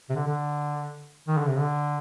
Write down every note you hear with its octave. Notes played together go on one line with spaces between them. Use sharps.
C3
D3
D3
D#3
D3
C3
D3